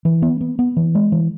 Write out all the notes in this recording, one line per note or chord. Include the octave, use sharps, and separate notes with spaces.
E3
B3
B3
B3
E3
G#3
E3